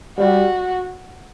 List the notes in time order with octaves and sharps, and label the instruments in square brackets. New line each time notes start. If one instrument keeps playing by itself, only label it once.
[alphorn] G3 [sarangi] F#4